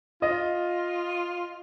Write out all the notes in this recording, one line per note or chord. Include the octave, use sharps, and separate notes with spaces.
F4 D#5